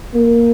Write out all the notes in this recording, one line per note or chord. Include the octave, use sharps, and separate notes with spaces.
A#3